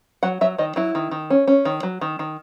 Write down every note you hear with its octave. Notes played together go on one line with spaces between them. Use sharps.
F#3 F#5
F#3 E5
D#3 D#5
F#3 E4
D#3
D#3
C#4
C#4
D#3
F#3
D#3
D#3